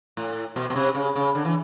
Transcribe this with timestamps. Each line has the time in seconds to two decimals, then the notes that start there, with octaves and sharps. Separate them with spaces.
0.17 A2
0.56 B2
0.70 B2
0.76 C3
0.95 C#3
1.16 C#3
1.35 D3
1.45 E3